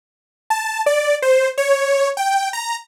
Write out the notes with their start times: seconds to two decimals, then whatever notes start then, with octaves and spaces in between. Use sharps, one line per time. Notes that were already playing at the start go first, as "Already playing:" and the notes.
0.50 A5
0.86 D5
1.22 C5
1.58 C#5
2.17 G5
2.53 A#5